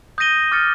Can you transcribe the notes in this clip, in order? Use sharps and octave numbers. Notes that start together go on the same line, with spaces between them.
D#6 G6 A#6 D#7 G7
D6 F6 A6 C#7